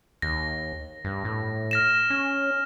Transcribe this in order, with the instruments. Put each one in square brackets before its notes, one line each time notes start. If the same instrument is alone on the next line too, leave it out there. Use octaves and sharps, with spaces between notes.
[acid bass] D#2 [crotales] A#6
[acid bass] G2
A2
[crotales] F6 A#6 E7
[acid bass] C#4